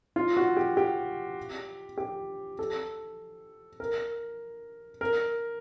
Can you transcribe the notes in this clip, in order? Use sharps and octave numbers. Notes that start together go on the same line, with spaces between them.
F4
F#4
G4
G4
G4
A4
A#4
A#4